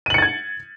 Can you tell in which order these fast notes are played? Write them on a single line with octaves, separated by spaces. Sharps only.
D#7 F#7 C#7 A6 G#6